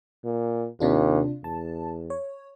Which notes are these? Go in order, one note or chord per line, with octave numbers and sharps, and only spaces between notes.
A#2
D#2 C3 D4 F4
E2 A5
C#5